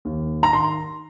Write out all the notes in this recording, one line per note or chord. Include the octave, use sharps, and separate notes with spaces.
D#2
D#3 A#5
C6